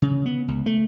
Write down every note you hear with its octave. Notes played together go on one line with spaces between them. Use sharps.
C#3
B3
C#2
A3